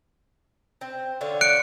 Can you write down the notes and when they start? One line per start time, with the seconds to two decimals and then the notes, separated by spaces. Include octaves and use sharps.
0.81 C4
1.21 D3 F4 C#5
1.41 F#6 C#7 D7